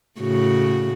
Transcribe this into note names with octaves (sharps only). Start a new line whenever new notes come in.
A2 C#3 F#4